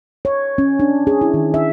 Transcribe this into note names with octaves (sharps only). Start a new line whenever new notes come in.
C#5
C#4
D4
G#4
E4
D#3
E5